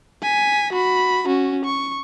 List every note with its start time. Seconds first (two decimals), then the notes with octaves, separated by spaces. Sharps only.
0.22 G#5 B6
0.73 F#4 B5
1.27 C#4 F#4
1.65 C#6